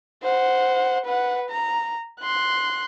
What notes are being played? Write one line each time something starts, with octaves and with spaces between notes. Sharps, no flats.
C5 F#5
B4 F#5
A#5
C6 F#6